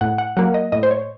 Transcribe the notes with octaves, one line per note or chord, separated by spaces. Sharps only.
A2 F#5
F#5
F#3 A#3 F#5
D#5
A2 D#5
C5
C#5